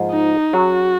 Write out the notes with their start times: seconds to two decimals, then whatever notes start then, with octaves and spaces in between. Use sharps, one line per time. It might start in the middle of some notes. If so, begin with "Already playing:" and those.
Already playing: G#2 F3 A#3 F4 G#4
0.12 D#4
0.53 F#3 C#4 F#4 G#4 C#5